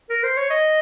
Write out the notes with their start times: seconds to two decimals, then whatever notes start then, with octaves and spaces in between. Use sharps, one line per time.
0.10 A#4
0.23 C5
0.37 C#5
0.50 D#5